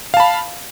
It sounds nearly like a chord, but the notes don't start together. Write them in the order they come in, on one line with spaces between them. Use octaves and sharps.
F5 A5 B5